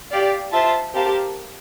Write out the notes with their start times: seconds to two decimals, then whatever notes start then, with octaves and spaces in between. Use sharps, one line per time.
0.11 G4 D5 F5
0.52 F4 C5 E5 A5
0.94 C4 G4 A#4 F5 A5